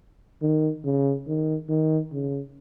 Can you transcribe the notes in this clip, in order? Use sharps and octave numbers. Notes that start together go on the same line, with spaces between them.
D#3
C#3
D#3
D#3
C#3